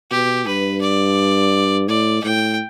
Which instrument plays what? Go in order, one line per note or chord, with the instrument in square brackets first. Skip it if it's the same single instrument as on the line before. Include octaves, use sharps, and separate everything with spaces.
[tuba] B2 [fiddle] G4
[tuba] G2 [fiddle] B4
[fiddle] D5
[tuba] A2 [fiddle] D5
[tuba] A2 [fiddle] G5